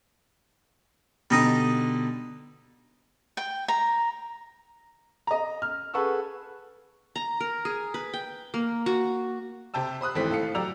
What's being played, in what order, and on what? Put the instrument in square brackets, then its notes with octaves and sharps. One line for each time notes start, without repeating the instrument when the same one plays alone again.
[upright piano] B2 D3 [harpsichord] G3 D#4 D#5
[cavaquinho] G5
A#5
[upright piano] D#5 A#5
F6
G#4 A4 B4 F#5 C#6 E6
[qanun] A#5
A#4
G#4
B4
G5
A#3
F#4
[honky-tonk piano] C3 G4 G5 A5 E6
C5 B5 D#6 F#6
G#1 E3 A3 C4 B6
A2 A4 F5 C#7
F#3 G4 D5 A#5 E6 F7